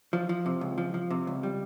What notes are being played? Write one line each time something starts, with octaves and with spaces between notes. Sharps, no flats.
F3
F3
C3
C#2
F3
F3
C3
C#2
G3